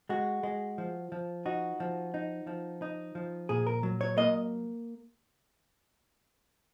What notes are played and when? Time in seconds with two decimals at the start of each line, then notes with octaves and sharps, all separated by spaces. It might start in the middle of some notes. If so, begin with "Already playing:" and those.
0.09 G#3 F#4
0.43 G#3
0.78 F3
1.12 F3
1.46 D#4 F#4
1.80 F3
2.14 D#4
2.47 F3
2.82 D#4
3.15 F3
3.49 A#2 G#4
3.67 A#4
3.83 F#3
4.01 C#5
4.17 A#3 D#5